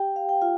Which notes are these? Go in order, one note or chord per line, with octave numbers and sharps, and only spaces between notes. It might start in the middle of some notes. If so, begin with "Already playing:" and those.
Already playing: G4 G5
F5
G5
F4 F5